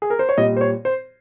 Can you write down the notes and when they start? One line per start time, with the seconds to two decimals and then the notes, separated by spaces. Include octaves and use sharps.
0.02 G#4
0.10 A#4
0.19 C5
0.29 C#5
0.38 A#2 G3 D#5
0.57 C5
0.61 C#5
0.85 C5